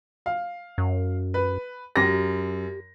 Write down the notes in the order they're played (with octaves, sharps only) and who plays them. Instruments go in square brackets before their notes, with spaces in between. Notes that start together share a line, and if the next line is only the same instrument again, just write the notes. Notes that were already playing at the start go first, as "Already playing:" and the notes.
[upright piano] F5
[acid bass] F#2
[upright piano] B4
[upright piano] F#2 A#6 [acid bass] G4